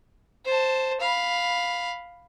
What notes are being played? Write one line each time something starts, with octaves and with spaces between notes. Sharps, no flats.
C5 A5
F5 B5